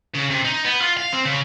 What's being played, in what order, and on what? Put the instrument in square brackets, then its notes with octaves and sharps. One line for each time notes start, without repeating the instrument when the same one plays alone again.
[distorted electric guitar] C#3
C3
D#4
B3
F4
F5
C4
C#3